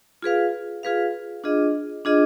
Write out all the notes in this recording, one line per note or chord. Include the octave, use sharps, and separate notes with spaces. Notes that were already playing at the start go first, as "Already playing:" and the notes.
F4 G#4 B4 F5
F4 G#4 B4 F5
D4 F4 G#4 D#5
D4 F4 G#4 D#5